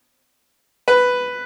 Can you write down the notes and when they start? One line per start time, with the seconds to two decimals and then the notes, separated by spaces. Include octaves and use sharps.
0.88 B4